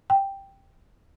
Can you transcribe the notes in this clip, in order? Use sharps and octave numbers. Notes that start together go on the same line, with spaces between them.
G5